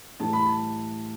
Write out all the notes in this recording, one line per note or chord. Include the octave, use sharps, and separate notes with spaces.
A2 E3 G3 A5
B5
A5